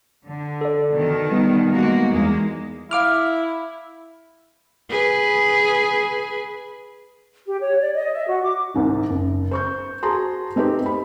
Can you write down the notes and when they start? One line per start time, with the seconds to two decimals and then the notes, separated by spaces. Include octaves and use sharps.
0.25 D3
0.61 A4 D5
0.92 B2 D#3
1.32 G3 B3 D#4
1.73 G#3 A#3 F#4
2.11 E2 G#3 A#3
2.91 E4 F5 D6 F6
4.90 G#4 B4
7.47 G4
7.62 C#5
7.81 D5
7.95 D#5
8.13 E5
8.29 F#4
8.43 D6
8.74 C2 G#2 D#3
9.10 F#1
9.51 C5 C#6 G6
10.03 F#4 G#4 C5 A5 A#5 C6
10.56 A3 C4 D#4 G4 B4 C5
10.86 B5